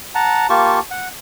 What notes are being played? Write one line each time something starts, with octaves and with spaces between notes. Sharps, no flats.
F#5 A5 A#5
A#3 F4 G4 A5 C#6
F#5